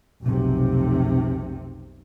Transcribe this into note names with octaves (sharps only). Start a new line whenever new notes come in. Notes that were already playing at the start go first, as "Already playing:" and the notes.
F1 B1 C3